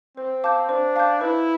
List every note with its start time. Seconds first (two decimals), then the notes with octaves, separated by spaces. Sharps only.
0.17 C4 C5
0.44 F5 A5 D6 G6
0.69 D4 C5
0.96 F5 A5 D6 G6
1.21 E4 B4